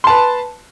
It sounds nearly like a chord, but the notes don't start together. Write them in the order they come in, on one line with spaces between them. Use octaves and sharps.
C6 A5 B4